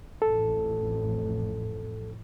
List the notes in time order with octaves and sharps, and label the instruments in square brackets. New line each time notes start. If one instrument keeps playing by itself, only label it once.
[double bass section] A1 F2 A2 [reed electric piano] A4